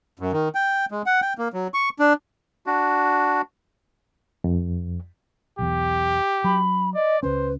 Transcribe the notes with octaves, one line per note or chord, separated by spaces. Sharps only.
F#2
D#3
G5
G#3
F#5
G5
A#3
F#3
C#6
D4
D4 F#4
F2
B1 E2 G4
F#3 B5
D5 D#5
C#2 C#4 B4 C5